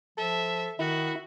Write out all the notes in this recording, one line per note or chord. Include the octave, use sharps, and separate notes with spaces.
F3 A4 E5
D#3 E4 F#4 E5